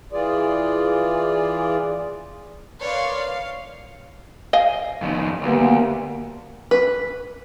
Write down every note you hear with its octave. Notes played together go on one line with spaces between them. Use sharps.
E3 F4 G#4 D5
A#4 B4 C#5 D5 F5 C6
F5
D#5 F5 G#5
F2 D#3
D2 G3 A#3 B3
B4